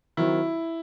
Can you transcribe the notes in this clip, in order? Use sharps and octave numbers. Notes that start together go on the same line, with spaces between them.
D#3 F#3 C4 E4